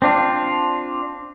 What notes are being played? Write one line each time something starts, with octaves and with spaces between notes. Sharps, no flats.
C4 D4 F4